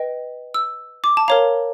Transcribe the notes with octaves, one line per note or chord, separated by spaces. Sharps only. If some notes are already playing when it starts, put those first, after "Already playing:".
Already playing: B4 D#5 G5
E6
D6
A5
A#4 C#5 F5 A#5